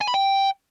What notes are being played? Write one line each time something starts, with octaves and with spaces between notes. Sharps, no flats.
G#5
B5
G5